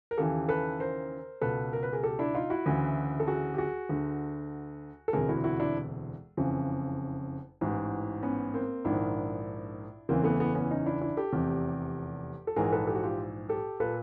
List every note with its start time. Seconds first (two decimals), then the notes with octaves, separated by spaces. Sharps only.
0.11 A#4
0.18 D#2 C#3 E3 G4 A4
0.49 A4 B4
0.80 A#4 C5
1.41 C#2 B2 A4 B4
1.73 A#4
1.83 B4
1.93 G#4 A#4
2.03 G4 A4
2.19 D4 E4
2.35 D#4 F4
2.50 E4 F#4
2.66 D2 C#3 E3
3.20 A4
3.27 F#4 G#4
3.54 G4
3.58 F#4 G#4
3.89 D2 D3
5.08 A4
5.13 E1 D2 C3 G#4 A#4
5.29 E4 F#4
5.44 E4 F#4
5.60 D4 E4
6.37 F#1 F2 C#3 E3
7.61 A1 G#2 E3
8.23 B3 C#4
8.54 A#3 C4
8.85 A#1 G#2 D#3 D4 E4
10.09 F#1 E2 C#3 E3 A#3 C4
10.24 A3 B3
10.40 A3 B3
10.55 B3 C#4
10.71 C#4 D#4
10.86 D4 E4
11.01 D4 E4
11.17 G4 A4
11.33 F1 E2 C3
12.47 A4
12.56 A#1 G#2 E3 G#4 A#4
12.72 A4 B4
12.87 G4 A4
12.95 F#4
13.03 F4 G4
13.49 G4 A4
13.80 A#2 A4 B4